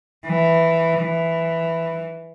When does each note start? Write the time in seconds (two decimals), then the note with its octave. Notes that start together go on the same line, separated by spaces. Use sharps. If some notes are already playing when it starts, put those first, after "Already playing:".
0.26 E3
1.01 E3